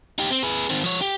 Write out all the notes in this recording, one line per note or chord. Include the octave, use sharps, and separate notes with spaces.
D#4 G4
C4
G#4 B4
D#3 C4
F3 C#5
G4